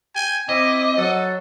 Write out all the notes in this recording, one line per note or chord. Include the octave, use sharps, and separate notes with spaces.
G5 G#5
C4 E4 D#5 D6
F#3 A4 F#5